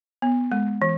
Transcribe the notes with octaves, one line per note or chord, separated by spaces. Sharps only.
B3
G#3
E3